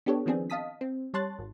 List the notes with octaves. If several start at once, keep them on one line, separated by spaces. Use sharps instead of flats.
B3 D4 G4 A4 C#5
D#3 F3 B3 C4 D4 G#4
D#5 F5 A5 D#6 B6
C4
G3 C#5 A5 C6 F#6 A6
G#1